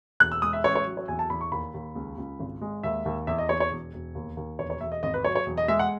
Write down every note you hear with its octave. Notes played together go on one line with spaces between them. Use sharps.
E1 F#6
E6
G#3 D#6
E5
A1 C#5
C#5
F#3
C#5
E2 G#5
A5
E2 B5
C#6
D#2 B5
D#2
C#2
C#2
G#1
G#3
D#2 E5
D#2
E2 E5
D#5
E2 C#5
C#5
E1
E1
D#2
D#2
E1 C#5
C#5
E1 E5
D#5
G#1 D#5
B4
F#3 C#5
C#5
E1
D#5
G#3 E5
F#5